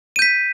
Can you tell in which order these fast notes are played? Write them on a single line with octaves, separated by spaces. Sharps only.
D#7 G6 B6